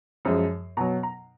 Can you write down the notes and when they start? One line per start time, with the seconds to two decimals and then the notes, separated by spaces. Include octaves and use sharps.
0.25 F#2 F3 G#3
0.77 B2 F#3 A#5
1.03 A#5